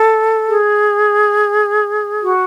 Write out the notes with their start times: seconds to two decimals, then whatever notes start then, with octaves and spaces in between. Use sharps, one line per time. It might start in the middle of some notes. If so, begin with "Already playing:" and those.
Already playing: A4
0.49 G#4
2.22 F#4